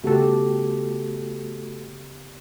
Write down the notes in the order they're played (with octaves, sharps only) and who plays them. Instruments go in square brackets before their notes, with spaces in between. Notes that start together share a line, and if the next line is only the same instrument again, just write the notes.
[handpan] C#3 B3 G4 [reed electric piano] A3 F#4 A4